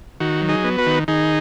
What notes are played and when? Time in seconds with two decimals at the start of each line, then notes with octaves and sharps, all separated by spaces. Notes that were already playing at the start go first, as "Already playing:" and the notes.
0.20 D#3 F#4
0.41 F#3
0.49 D#4 G#4
0.64 B3
0.78 F#4 B4
0.86 D#3
1.08 D#3 D#4 G#4